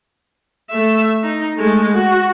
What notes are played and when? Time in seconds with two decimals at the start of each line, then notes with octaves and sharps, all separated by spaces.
0.70 A3 E5
1.23 D#4
1.56 G#3 A3
1.92 F#4